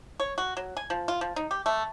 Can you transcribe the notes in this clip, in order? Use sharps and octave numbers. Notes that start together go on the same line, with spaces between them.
C#5
F#4
F#3
G#5
F3
F4
F3
D#4
G4
A3